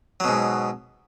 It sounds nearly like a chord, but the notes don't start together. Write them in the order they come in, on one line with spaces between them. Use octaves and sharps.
F#3 B2 G#2